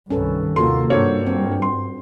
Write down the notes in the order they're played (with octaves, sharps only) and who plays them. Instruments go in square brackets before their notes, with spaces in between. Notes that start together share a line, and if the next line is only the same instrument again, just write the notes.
[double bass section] C2 G2 D#3 [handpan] C#4 A4 B4
[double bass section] D#2 C3 A#3 [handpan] F4 F#4 A4 [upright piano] C6
[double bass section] G2 [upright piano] A#3 A4 C#5 [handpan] D4 F#4 C5
[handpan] C4
[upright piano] C6